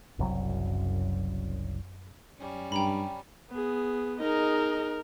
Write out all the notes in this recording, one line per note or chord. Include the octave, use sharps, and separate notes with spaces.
F#1 C2 F#2 F#3
F#2 G3 C#4
G2 G5 A#5 B5
B3 G#4
D#4 G#4 A#4 D#5